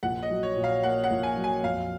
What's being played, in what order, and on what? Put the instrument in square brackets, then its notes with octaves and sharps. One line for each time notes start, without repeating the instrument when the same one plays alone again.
[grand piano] A#1 [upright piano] F#5
[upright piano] D#5
[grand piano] F#3
[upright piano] C#5
[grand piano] A#2
[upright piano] F5
[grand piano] A#3 [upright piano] F#5
[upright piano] F#5
[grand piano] A#1
[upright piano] G#5
[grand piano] F#3
[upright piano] G#5
[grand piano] F2 [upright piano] F5